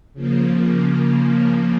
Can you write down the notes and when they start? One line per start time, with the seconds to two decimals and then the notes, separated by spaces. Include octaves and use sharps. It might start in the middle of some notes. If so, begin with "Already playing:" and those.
0.13 C#3 F3 A#3